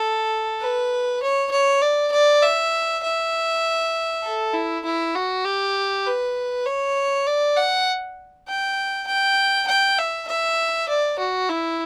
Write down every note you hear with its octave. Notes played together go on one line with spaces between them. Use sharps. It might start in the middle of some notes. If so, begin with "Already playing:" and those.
Already playing: A4
B4
C#5
C#5
D5
D5
E5
E5
A4
E4
E4
F#4
G4
B4
C#5
D5
F#5
G5
G5
G5
E5
E5
D5
F#4
E4